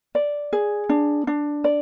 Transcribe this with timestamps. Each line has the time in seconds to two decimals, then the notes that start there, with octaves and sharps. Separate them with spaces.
0.15 D5
0.53 G#4
0.89 D4
1.27 D4
1.64 D5